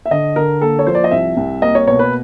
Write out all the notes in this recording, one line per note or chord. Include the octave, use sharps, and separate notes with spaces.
E5
D3 D#5
D3 A#4
A#3 A4
C#5
F3 C5
D5
D#5
C2 E5
C2
A#3 D#5
C#5
B2 C#5
B4